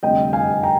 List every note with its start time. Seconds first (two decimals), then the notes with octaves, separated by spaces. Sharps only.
0.03 F1 F2 D3 G3 D#5 G5
0.33 F5 G#5
0.63 G5 A#5